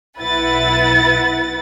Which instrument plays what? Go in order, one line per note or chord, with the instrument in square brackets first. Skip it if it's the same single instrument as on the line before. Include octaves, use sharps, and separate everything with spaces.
[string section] B1 E4 B4 F#5 A6